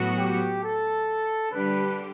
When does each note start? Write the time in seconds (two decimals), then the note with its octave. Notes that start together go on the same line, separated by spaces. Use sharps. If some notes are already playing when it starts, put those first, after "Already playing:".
Already playing: A2 F#3 B3 F#4
0.18 G4
0.63 A4
1.52 D3 G3 D4 G4 B4